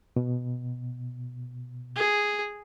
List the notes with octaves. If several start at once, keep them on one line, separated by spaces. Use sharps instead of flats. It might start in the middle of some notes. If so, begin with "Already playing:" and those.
B2
G#4